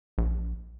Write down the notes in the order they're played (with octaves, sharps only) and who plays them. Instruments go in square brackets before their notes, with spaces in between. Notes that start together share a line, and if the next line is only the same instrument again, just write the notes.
[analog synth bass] A#1